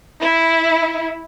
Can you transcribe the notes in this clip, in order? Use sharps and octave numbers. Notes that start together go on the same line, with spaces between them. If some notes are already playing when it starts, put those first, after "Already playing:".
E4